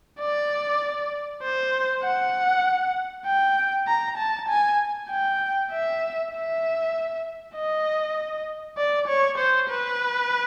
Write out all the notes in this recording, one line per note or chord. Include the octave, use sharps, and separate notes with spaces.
D5
C5
F#5
G5
A#5
A5
G#5
G5
E5
E5
D#5
D5
C#5
C5
B4